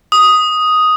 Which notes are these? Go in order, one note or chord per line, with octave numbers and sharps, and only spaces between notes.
D#6